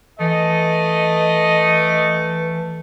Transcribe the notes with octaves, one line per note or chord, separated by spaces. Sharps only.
E3 A3 D#5